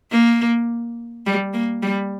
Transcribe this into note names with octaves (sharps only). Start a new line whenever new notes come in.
A#3
G3
A#3
G3